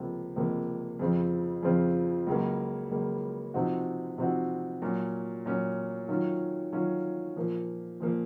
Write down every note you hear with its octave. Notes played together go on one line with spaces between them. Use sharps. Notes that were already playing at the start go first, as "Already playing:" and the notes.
Already playing: C#2 C3 F3 A#3
C#2 C3 F3 A#3
F2 C#3 F3 C4 F4
F2 C#3 F3 C4 F4
C#2 C#3 F#3 A#3
C#2 C#3 F#3 A#3
C3 F3 C4 D#4 F#4
C3 F3 C4 D#4 F#4
A#2 F#3 C#4
A#2 F#3 C#4
D#3 F#3 C#4 F4
D#3 F#3 C#4 F4
A#2 F3 A#3
A#2 F3 A#3